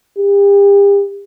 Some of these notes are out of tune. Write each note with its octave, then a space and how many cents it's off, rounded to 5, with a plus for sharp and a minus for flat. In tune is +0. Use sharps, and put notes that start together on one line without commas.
G4 +40